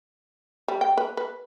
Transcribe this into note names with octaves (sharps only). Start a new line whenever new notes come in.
G3
G5
B4
B4